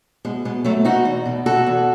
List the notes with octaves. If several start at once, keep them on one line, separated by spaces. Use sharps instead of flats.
B2 G#3
B2 G#3
B2 F#3 A3
B2 D#4 F#4
E2
B2
B2 F#4 A4
E2